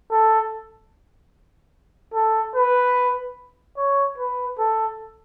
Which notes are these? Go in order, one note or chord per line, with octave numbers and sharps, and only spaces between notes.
A4
A4
B4
C#5
B4
A4